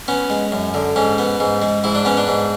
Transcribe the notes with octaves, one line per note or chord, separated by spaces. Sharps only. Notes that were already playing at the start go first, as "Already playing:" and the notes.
B3 C#4
G#3
F#2
D3
G#2 C#4
B3
G#2
G#3
G#2 E4
D4
B3 C#4
D4
G#2